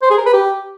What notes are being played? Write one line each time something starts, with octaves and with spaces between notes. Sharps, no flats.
C5
G#4
A#4
B4
G4